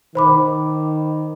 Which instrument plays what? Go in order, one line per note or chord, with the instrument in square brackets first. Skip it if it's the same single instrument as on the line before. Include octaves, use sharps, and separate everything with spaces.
[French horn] D#3 [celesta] C5 B5 D6